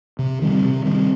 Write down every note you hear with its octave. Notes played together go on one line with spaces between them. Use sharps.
C3
D#3 G3 C4
C3
D#3 G3 C4